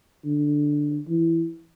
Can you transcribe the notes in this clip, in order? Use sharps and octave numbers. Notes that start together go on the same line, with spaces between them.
D3
E3